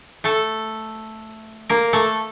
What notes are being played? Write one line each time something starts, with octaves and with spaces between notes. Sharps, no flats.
A3 A4
A#3 A#4
A3 A4